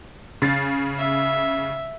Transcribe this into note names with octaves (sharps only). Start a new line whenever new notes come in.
C#3 A6 C7
E5